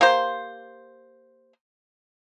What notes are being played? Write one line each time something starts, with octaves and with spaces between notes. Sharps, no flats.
A#3 G4 C5